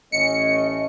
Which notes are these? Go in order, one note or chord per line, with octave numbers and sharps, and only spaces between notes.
A1 A3 C#4 D#5 C#7